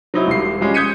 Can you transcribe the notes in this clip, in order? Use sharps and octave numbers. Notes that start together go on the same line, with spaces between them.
F#3 C4 D#4 E4
E1 G3 C7
F3 G3 G#3 C#4
D#6 G6 G#6 B6 C#7 D#7